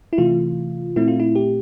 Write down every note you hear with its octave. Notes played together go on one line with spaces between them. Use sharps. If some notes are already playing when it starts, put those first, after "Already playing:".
E4
C3 E3 A3 F4
A#2 A3 C4 E4
F4
E4
G4